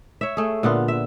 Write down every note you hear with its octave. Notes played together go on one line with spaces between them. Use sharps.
C#5 E5
A3 G#4
A#2 D3 B3 F4
E5